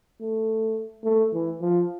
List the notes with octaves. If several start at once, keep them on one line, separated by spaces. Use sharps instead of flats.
A3
A3
E3
F3